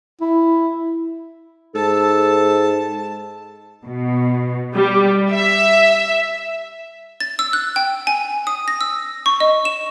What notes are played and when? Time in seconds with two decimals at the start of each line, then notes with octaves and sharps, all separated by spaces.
0.21 E4
1.75 G#2 A4 A5
3.86 B2
4.73 G3
5.32 E5
7.20 A6
7.39 E6
7.53 F#6
7.76 G5
8.07 G#5
8.47 D#6
8.68 A#6
8.81 E6
9.26 C#6
9.40 D#5
9.65 E7